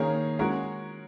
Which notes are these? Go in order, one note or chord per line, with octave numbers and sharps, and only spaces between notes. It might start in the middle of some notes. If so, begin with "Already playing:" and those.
Already playing: D#3 A#3 C#4 G#4 C#5
G#3 C#4 F#4 A#4 C#5